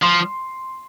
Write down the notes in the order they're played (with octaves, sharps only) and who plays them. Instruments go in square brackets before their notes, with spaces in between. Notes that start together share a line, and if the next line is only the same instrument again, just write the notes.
[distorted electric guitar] F3 [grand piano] C6